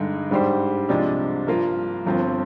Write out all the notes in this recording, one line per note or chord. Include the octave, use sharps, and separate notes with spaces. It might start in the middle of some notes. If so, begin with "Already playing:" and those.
Already playing: G2 D3 G#3 D#4 G#4
G#2 G3 D4 G4 C5
C2 C3 F3 G#3 D4
G2 F3 A#3 F4
G1 G2 F3 C4